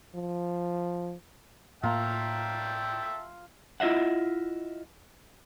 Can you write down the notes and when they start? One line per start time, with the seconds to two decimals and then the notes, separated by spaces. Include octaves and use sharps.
0.15 F3
1.83 A2 A#3 F4 E5 G5 A5 A#5
3.80 E4 F4 D#5 E5 F#5